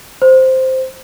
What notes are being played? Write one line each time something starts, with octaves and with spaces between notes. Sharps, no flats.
C5